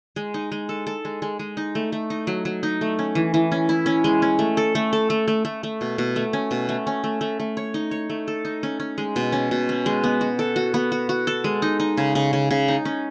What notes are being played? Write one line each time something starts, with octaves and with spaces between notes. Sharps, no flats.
G#3
D#4
G#3
A4
A4
G#3
G#3
G#3
D#4
A3
A3
D#4
F#3
F#3
D#4
A3
C#4
E3
E3
C#4
E4
C#4
G#3
C#4
A3
A4
A3
A4
A3
A3
A3
A3
B2
B2
A3
C#4
B2
A3
C#4
A3
A3
A3
C#5
D#4
C#5
A3
A4
D#4
C#4
C#4
G#3
B2
C#4
B2
C#4
G#3
B3
F#4
A4
F#4
B3
F#4
F#4
A4
G#3
D#4
D#4
C#3
C#3
C#3
C#3
D#4
C#4